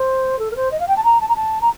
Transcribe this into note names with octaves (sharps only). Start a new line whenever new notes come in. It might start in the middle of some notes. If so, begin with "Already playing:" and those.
Already playing: C5
A4
A#4
C5
D#5
F5
G5
A5
A#5
A5
A#5
A5
A#5